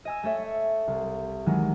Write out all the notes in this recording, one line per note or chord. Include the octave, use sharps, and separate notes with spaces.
D#5 G#5 E6
A3 A4 C#5 E5
C2
D#3 E3 F#3 G#3